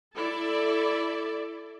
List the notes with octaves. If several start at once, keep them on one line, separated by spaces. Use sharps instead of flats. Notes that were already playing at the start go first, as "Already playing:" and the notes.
E4 A4 D5